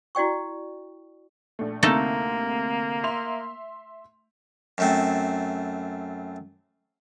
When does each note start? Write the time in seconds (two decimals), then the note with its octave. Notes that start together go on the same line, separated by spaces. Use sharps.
0.15 E4 F#4 D5 G5 C#6
1.59 A#1 A3
1.83 D2 C3 A3 A#3 D#4 A4
3.04 E5 C6 F7
4.78 F#2 A3 C4